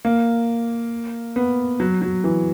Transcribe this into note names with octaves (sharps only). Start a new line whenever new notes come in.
A#3
B3
F#3
F#3
E3